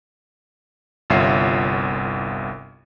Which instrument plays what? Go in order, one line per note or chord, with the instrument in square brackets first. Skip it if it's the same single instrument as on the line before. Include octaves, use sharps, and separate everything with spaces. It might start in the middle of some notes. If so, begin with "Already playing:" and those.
[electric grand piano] G1 C2 F4 C#5 E5 C7